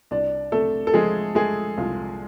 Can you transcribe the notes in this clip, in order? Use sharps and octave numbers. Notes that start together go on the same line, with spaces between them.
C2 D4 D5
C3 A3 A4
A4
F3 G#3 G#4
G#3 A3 G#4
C2 F4